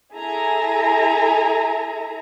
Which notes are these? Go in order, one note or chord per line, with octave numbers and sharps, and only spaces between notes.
E4 G#4 A4 E5 G#5 A#5